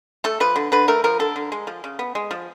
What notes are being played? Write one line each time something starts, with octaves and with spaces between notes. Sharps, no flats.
A3 A4
F3 B4
D3
D3 B4
A3 A#4
F3 A#4
D3 A4
D3
G#3
F3
C#3
B3
G#3
F3